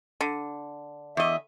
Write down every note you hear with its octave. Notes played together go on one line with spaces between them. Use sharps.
D3
E2 D#5 E5